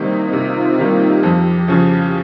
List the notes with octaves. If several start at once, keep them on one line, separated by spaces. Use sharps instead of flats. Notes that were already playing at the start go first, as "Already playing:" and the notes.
Already playing: C3 D#3 G3 A#3 C4 D#4
C3 F4
D#3 G3 A#3 G4
F2 G4
C#3 F3